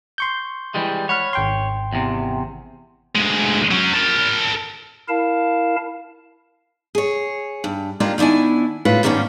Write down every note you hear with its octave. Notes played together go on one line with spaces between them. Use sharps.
C6 C#6 G6
E3 G3 G#3
C#5 F#5 B5 F6
G#1 G5 C6
E2 C3
D2 G#3
F#3 C#4
A#4 A5
E4 A#4 F5 A5
G#4 C#5
G2
G#3 A#3 D4 F4 G4 A#4
D#3 B3 D4 E4 G#5
A2 C#3 F4 B4 C#5
G#2 D#3 A#3 B3 C#4 D4